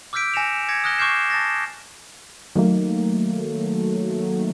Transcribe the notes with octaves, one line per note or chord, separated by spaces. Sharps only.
D6 E6 F6 G6 B6 D7
G#5 A#6 C#7 E7 F7
D6 G#6 A#6 C#7
D#6 F6 F#6 A#6 G7
C#6 D6 F6 G6 C7 E7
A5 D#6 A6 A#6
D#3 F#3 A3 A#3